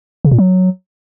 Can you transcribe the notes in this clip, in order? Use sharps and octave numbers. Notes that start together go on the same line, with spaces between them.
C#3
A#2
F#3